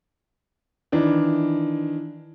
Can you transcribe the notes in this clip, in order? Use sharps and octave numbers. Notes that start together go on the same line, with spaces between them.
D#3 E3 D4